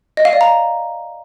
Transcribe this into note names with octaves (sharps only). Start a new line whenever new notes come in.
D#5
F5
D5
A#5